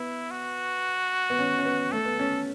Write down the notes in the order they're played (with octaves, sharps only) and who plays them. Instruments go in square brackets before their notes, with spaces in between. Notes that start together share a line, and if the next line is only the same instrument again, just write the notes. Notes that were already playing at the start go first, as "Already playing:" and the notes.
Already playing: [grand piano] B3 [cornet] E4
[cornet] F#4
[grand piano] B3
C#4
C#4
B3
[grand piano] A3 [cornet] A4
[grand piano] B3
C#4